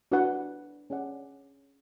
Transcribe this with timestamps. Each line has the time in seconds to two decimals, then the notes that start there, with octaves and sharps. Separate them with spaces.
0.12 D4 F#4 B4 F#5
0.90 C#4 G#4 D5 F#5